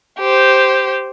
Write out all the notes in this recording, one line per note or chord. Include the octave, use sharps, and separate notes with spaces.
G4 C5